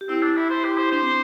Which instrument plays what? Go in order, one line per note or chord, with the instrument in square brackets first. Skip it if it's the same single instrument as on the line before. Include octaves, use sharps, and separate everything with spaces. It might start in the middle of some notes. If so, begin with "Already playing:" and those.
[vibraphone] G4
[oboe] C4 [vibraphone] E4
[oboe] D4
E4
C5
G4
C5
[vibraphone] D4 [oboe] C5
[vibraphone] C4